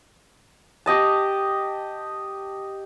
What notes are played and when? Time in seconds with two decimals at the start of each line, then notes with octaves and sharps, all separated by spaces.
0.86 G4 D#5 A5